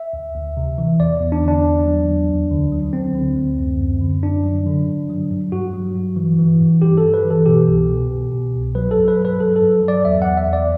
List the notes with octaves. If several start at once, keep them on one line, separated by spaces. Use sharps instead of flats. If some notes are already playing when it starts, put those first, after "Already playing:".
Already playing: E5
D2
D2
C3
E3
E2 D5
E2
D4
D3 D4
E2
F#3
E2
D2
D3
F#3
D2 C4
D3
D2
F#2
F#2
D3
F#2 D4
F#3
D3
G2
F#3
G2
G2 F#4
F#3
G2
E3
E3
G2
G2 G4
A4
G2
B4
E3
A4
B2 G4
C2
B2
B2
B2
C2
F#3 B4
A4
G2
B4
F#3
B4
F#3 A4
A4
G2
F#3
D5
E2 E5
E2 F#5
E5
E2
D5